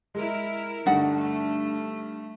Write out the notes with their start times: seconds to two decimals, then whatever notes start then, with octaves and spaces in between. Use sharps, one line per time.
0.15 G#3 E4 A#4
0.86 G2 D3 A3 D4 D#4 D5 F#5
1.15 A3